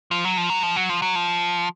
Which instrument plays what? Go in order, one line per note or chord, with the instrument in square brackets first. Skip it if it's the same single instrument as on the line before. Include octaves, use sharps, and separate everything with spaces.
[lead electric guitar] F3
F#3
F3
F#3
F3
F#3
F3
F#3
F3